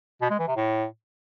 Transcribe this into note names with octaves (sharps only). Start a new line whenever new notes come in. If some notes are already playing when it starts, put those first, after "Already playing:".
B2
G#3
E3
C3
A2